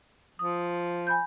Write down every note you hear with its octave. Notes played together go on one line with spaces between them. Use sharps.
F3 D#6
G#5 B5 G6